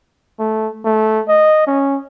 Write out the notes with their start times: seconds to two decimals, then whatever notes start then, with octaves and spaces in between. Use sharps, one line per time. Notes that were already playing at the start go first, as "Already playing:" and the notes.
0.39 A3
0.85 A3
1.28 D#5
1.67 C#4